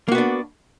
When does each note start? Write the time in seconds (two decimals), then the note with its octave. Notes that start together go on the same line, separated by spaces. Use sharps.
0.08 A#3
0.12 F#4
0.15 B3
0.18 D4